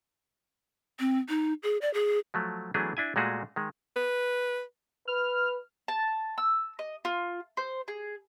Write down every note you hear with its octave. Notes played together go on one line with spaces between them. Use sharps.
C4
D#4
G#4
D5
G#4
F3 F#3 A3
E3 F#3 A3 B3 D4 G#4
D4 E4 G#5
A#2 G#3 A3 F#4 G#4
D#3 G#3
B4
B4 F6
A5
E6
D#5
F4
C5
G#4